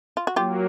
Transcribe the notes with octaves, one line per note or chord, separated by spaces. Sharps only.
F4
F#4
F#3 A#3 F4 G4